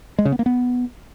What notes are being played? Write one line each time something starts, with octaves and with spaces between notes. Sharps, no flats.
G#3
C#3
B3
A#3
B3